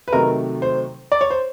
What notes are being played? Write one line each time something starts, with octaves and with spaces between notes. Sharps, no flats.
B4
C3 D#3 F#3 A3 A#4
C5
D5
C#5
C5